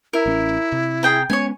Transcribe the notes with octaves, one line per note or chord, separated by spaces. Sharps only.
E4 A#4
A1 C#4
C3
G#4 G5 A#5
G#3 B3 C#4 C#5 G#5